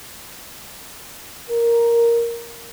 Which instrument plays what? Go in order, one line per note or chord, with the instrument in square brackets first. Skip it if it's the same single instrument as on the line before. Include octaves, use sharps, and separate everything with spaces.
[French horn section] A#4